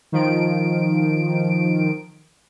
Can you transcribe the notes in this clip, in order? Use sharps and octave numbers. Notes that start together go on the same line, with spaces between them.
D#3 F3 D7